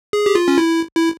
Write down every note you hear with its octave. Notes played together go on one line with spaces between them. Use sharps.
G#4
G4
F4
C#4
E4
E4